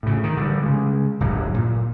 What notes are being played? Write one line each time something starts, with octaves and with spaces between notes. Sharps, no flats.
A2 C#3
D#3
D3 D#3 G3
C#3 G#3
D1 G1 F#3
A#2